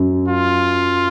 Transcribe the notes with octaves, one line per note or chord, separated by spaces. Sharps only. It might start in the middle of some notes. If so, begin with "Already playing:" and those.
Already playing: F#2 F#3
F4